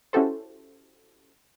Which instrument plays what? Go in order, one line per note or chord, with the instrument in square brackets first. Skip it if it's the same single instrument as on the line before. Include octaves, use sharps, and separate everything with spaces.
[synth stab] C#4 E4 F#4 G4 A4 C5